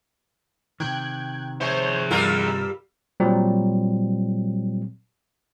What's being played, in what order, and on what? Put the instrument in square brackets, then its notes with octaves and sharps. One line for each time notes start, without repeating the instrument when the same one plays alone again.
[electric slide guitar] C3 D#3 [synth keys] G5 F#6 G#6
[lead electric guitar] G#4 E5 [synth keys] C5 C#5
[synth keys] G2 A#4 E6 [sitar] G3 F4 G4
[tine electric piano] A#2 F#3 G3 C4